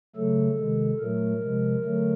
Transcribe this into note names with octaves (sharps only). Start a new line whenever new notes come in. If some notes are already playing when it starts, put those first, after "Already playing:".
C#3 F#3 A3 A4
C3 D#3 G#3
A#2 F#3 A3 A#4
C3 F3 G#3
D3 F#3 A3